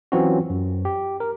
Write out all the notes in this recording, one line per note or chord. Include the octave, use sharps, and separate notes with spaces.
E3 F#3 C4 C#4 F4 F#4
F#2
G4
A#4